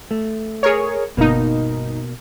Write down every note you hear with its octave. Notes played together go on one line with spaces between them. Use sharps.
A3
G#4 A#4 C#5
G1 B2 A#3 D#4